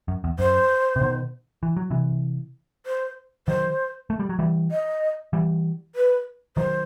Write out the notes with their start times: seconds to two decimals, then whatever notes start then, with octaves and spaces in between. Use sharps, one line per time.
0.08 F#2
0.24 E2
0.39 F#2 C5
0.96 C3
1.01 B2 D#3
1.63 E3
1.77 F#3
1.90 C3 E3
2.86 C5
3.48 D#3 F#3 C5
4.10 A3
4.20 G3
4.29 F#3
4.39 E3 G3
4.71 D#5
5.33 E3 G3
5.95 B4
6.57 D#3 F#3 C5